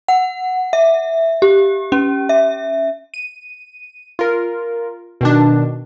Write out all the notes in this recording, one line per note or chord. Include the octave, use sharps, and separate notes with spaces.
F#5
E5
G4
C#4
E5
D#7
F4 A#4
B2 D#3 D4